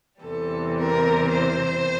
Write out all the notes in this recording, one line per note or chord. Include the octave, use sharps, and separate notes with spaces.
E2 C3 E3 G3 A4
A#4
C5